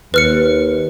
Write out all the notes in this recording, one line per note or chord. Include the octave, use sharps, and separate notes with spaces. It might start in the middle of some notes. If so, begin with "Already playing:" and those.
D#2 B4 F6 C#7